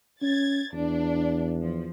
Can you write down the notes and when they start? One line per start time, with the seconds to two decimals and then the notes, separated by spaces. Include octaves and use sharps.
0.22 C#4 G#6 A6
0.73 E2 D4
1.61 F3